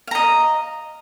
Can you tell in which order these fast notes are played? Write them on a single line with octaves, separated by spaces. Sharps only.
F5 A#5 D#5